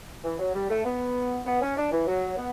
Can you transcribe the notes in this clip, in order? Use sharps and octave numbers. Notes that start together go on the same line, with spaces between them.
E3
F#3
G3
A3
B3
B3
C#4
D4
E3
F#3
B3